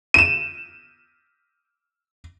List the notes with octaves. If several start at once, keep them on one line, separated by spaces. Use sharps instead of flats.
D#7 E7